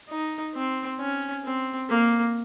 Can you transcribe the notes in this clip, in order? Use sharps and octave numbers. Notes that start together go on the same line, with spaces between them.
D#4
C4
C#4
C4
A#3